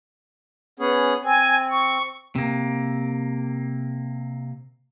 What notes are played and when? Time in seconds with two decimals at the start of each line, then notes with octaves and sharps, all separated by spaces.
0.79 B3 C#4 G#4
1.24 C4 G#5
1.71 C#6
2.35 C3 A#3